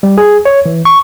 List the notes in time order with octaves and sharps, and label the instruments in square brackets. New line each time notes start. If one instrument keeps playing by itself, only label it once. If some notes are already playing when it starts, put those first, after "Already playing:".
[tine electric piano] G3
G#4
C#5
E3
C#6